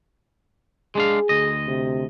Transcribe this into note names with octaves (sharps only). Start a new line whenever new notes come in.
G#3 D4 G#4 F5
D2 D#5
C3